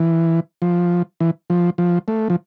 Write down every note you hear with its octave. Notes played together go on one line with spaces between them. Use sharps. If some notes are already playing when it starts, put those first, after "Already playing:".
Already playing: E3
F3
E3
F3
F3
A3
F3